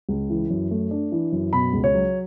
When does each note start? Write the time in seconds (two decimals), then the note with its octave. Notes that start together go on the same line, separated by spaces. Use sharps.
0.09 C#2
0.30 E3
0.50 F#2
0.71 A3
0.91 D4
1.12 E3
1.32 F#2
1.53 B2 B5
1.73 C#2
1.84 C#5
1.94 F#3